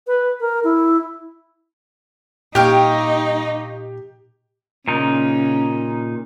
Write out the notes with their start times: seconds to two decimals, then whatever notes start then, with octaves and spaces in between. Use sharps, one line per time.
0.07 B4
0.40 A#4
0.64 E4
2.55 A#2 D#4 G4 C#5 F5 G5
4.88 A#2 C#3 D#4